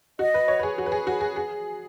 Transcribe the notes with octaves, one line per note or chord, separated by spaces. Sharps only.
F#4 D#5
B4
C#5
B4
G#4
F#4
B4
G#4
F#4
G#4
G#4